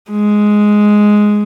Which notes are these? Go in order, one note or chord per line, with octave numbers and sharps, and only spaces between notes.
G#3